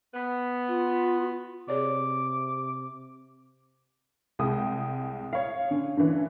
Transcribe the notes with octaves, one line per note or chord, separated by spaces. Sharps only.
B3
F4
C3 G#4 C#5 D5 D6
C2 G#3 G5 D#6
C#5 F5
D3 C#4
G2 D3 E3 C#4